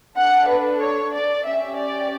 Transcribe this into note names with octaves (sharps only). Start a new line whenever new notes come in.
D4 A4 F#5
B4
C#5
D5
C#4 G4 E5
D5